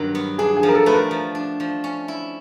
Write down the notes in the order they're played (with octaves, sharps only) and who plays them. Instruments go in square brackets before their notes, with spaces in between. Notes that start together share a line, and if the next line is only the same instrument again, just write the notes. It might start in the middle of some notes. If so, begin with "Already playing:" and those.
Already playing: [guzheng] G2 D#3 F#3 [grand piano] A#4
[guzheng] B3
[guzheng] D4 [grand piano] G#4
[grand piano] G#4
[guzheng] F3
[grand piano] A#4
A4
[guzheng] A3 [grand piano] B4
[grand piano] A#4
[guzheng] F3
D4
F3
C#4
E4